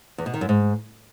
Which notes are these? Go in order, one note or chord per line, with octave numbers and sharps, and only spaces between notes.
E2
B2
D#3
F#2
G#2